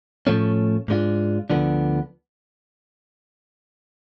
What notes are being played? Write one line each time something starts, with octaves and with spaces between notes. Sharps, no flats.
A2 F3 A3 C#4
G#2 G#3 D4 F4
D2 D3 F3 B3 D4